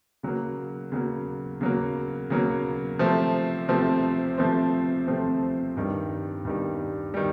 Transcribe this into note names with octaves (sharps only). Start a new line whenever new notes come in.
C#3 F#3 A#3
C#3 F#3 A#3
C#3 F#3 A#3
C#3 F#3 A#3
C3 F3 A3 C4
C3 F3 A3 C4
C3 F3 A3 C4
C3 F3 A3 C4
G2 D#3 G3
G2 D#3 G3
D#3 G3